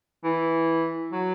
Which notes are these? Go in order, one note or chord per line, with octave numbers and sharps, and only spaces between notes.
E3
F#3